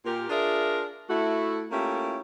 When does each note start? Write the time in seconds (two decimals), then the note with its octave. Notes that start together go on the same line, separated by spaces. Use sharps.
0.05 A#2 G4 A#4
0.30 D4 F4 G#4 A#4 D5 E5
1.09 A3 E4 F#4
1.71 A3 A#3 C#4 E4 F4 G4